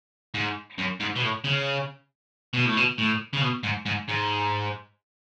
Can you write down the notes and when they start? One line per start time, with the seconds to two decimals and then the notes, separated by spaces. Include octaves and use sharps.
0.35 G#2
0.79 F#2
1.00 G#2
1.16 B2
1.22 A2
1.44 C#3
2.54 B2
2.65 A2
2.77 B2
2.98 A2
3.33 C#3
3.41 B2
3.63 G#2
3.86 G#2
4.08 G#2